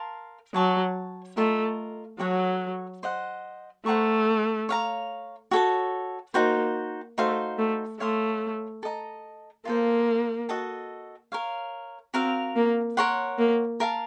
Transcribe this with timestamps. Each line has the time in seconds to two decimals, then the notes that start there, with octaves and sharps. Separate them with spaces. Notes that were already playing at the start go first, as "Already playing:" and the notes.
Already playing: A#4 F5 A5 C6
0.54 F#3 C#5 A5 C#6
1.37 A3 F4 A#4 D#5
2.20 F#3 F#4 A4 C#5 F#5
3.03 C5 D#5 F#5
3.85 A3 C5 F#5 A#5 C#6
4.69 C#5 F5 A#5
5.51 F#4 A4 C#5 A5
6.34 A#3 D#4 F#4 C5
7.18 A3 D#4 F#4 C5 F5
7.58 A3
8.00 A3 C#5 F5 C6 D#6
8.83 A4 D#5 A#5
9.65 A#3 F4 A4 C5
10.49 F#4 A4 D#5 A5
11.32 A#4 C#5 F5
12.14 C4 F#4 A#4 F5
12.56 A#3
12.97 A#4 C#5 F#5 C6
13.38 A#3
13.80 A#4 F5 A5